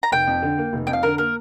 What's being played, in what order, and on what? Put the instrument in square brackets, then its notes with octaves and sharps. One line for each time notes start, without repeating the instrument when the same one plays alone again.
[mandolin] A#5
[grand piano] F1 [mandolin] G5
[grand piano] F2
D3
A#3
F1
[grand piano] F2 [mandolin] G5
[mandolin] F5
[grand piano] D3 [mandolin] A#4
[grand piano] A#3 [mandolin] A#4